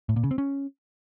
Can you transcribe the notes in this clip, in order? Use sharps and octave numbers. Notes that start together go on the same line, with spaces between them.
A2
A#2
C#3
C4
C#4